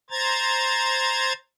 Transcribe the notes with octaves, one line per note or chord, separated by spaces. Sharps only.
C5 A#5 G#6 A6